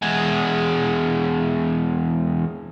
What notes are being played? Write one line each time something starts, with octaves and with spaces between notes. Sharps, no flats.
E2 G#3